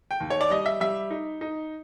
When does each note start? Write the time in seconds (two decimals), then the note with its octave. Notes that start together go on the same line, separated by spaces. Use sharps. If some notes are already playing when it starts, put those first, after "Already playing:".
0.11 G5
0.20 D#2
0.30 C#5
0.41 D5
0.50 G3 D#5
0.66 E5
0.80 G3 E5
1.10 D#4
1.41 D#4